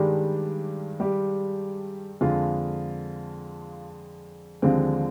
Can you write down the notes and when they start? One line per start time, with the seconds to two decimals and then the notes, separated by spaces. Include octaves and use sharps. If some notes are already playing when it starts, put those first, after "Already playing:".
Already playing: G2 D#3 G3 G#3 D4 G4
1.00 G3 G4
2.21 F2 D3 G#3 F4
4.62 D#2 D3 F3 G#3 C4